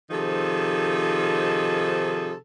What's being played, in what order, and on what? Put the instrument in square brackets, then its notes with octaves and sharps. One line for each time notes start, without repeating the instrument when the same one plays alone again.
[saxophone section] C3 D#3 F3 D#4 G#4 A4